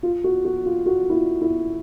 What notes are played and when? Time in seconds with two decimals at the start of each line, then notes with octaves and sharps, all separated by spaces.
0.03 F4
0.24 F#4
0.45 F#4
0.66 F4
0.86 F#4
1.10 E4
1.14 F4
1.41 E4